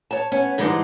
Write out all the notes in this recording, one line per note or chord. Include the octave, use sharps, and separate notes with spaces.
C#5 A5
B3 C#4
G#2 D3 E3 G3 G#3 D#4